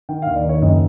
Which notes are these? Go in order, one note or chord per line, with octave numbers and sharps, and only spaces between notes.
D#3 G5
F5
D#2
D5
D#3 C#5
F#1 D#5